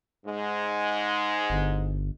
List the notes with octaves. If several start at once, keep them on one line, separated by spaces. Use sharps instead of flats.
G#2 G#3
G1